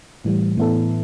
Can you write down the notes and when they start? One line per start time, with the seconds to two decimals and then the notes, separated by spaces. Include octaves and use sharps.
0.25 A2 E3 G3
0.57 A2 E3 B3 E4 A4